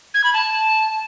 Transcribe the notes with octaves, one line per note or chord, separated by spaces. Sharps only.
G#6
B5
A5